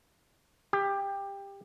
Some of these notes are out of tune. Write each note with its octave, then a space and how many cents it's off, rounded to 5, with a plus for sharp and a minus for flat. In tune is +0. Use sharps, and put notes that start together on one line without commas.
G4 +20